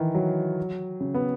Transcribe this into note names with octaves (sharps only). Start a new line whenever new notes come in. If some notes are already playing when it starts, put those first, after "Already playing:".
Already playing: D#3 E3
F#3
C#3
B3